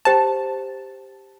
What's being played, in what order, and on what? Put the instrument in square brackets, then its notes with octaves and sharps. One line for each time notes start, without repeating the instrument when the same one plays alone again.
[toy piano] G4 C5 G5 A#5 [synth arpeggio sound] A5